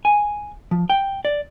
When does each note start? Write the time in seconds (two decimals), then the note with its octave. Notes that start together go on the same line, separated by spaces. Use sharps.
0.05 G#5
0.71 F3
0.90 G5
1.25 D5